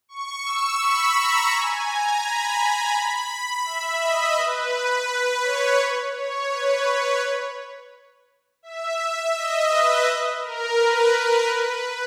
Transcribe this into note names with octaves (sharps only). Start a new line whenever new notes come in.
C#6
E6
B5
A#5
G#5
A#5
B5
A#5
B5
B5
E5
D#5
B4
B4
B4
C#5
C#5
B4
C#5
E5
D#5
B4
A#4
B4
A#4
B4